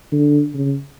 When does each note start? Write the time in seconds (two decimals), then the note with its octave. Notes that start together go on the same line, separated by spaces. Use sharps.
0.12 D3
0.54 C#3